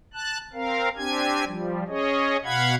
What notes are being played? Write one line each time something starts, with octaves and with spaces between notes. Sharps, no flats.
A5 F#6
C4 A#4 F5
C4 D4 G4 G#5 G#6
F3 G3
C#4 G#4 C#5 D#5
B2 F5 F#5 B5 G#6